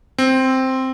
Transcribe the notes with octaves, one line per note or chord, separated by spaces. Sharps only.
C4